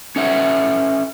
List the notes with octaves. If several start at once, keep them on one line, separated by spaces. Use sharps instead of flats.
C#4 A4 E5 F#5